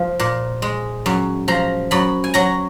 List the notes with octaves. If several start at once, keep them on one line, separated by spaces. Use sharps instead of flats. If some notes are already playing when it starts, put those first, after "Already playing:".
Already playing: F3
A#2
G#3
F#2
F3 A#5
F#2 B5
G#5
F#3 A#5